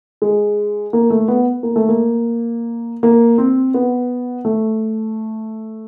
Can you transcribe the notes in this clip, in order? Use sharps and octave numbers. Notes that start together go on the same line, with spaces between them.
G#3
A#3
A3
B3
A#3
A3
A#3
A#3
C4
B3
A3